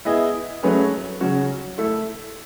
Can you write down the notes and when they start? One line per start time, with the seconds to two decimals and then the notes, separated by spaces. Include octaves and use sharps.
0.05 B3 E4 G#4 D#5
0.63 F#3 A3 C#4 G#4 B4
1.21 C#3 F#3 C#4 F#4
1.78 A3 E4 A4 E5